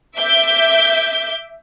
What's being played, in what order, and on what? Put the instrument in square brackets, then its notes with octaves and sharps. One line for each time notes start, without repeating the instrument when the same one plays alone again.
[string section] E5 D6 G6